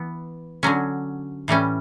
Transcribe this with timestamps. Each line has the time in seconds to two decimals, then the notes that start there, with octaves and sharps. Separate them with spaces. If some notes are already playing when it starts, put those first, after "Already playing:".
Already playing: E3 B3
0.63 D3 F#3 C#4
1.48 A2 E3 G3 C#4